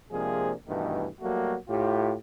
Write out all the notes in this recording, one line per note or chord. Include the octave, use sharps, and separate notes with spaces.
C3 F3 G#3 A#3 D4 G#4
G2 B2 D#3 E3 A3
F#3 G3 A3 A#3 F#4
A2 F4 G4